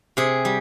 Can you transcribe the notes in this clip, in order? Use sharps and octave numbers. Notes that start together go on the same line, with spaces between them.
C3 G#4
G3